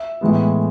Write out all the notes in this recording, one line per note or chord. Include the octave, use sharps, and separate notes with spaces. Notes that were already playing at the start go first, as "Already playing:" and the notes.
Already playing: E5
A2 E3 G#3 B3